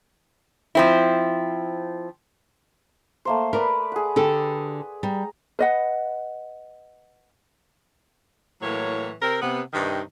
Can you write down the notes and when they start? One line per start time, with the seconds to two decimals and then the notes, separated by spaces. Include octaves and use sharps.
0.75 F3 C4 E4
3.25 A3 A#3 C5
3.53 A#4 B4 D5 B5
3.92 G#4 F#5
4.16 D3 G4 A4
5.03 G3 A#5
5.59 B4 D#5 F#5
8.61 A2 E3 F#3 A#3 C#5
9.21 C3 C4 A#4
9.41 C3 B3
9.72 G2 C3 D#3